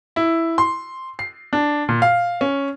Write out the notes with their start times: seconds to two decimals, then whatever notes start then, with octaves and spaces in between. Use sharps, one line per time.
0.16 E4
0.58 C6
1.19 C7
1.53 D4
1.89 A#2
2.02 F5
2.41 C#4